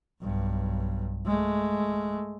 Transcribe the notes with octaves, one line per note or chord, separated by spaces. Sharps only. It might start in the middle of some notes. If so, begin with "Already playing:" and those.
B1 G2
G#3 A3